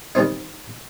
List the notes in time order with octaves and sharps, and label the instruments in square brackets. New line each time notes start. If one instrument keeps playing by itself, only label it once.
[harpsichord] D#3 G3 C4 D#4